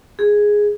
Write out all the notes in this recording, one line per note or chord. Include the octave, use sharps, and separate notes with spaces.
G#4